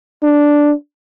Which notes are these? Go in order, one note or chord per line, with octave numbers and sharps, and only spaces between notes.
D4